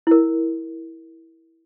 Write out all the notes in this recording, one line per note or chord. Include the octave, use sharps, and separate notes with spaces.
E4 A#4